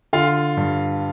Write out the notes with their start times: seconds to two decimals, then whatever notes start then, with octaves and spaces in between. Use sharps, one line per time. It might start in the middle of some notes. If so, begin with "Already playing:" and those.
0.13 D3 F4 F5
0.57 G2